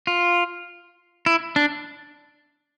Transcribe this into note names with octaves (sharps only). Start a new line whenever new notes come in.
F4
E4
D4